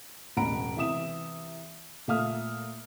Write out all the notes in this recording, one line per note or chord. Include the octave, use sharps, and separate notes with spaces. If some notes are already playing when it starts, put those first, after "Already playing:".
E1 A1 F#5 A#5 B5 D7
C3 E3 E5 D#6 E7
A#2 A3 E5 F5 D#6 F6